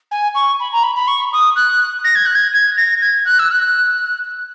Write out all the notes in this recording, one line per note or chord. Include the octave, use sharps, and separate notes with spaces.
G#5
C#6
B5
A#5
B5
B5
C#6
D#6
F#6
A#6
G#6
F#6
G#6
G#6
A#6
G#6
F#6
E6
F#6